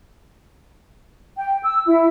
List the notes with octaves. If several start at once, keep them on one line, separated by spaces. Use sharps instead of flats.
G5
E6
E4